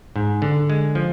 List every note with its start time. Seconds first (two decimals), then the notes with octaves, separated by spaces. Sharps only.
0.16 G#2
0.42 D3
0.70 G#3
0.95 F3